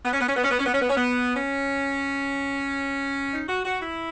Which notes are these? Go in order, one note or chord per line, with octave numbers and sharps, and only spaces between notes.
B3
C#4
B3
C#4
B3
C#4
B3
C#4
B3
C#4
B3
C#4
B3
C#4
D#4
F#4
F#4
E4